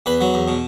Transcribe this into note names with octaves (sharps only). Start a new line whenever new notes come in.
E2 B4
F#3
E2
B2